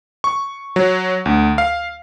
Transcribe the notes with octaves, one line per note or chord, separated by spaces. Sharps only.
C#6
F#3
D2
F5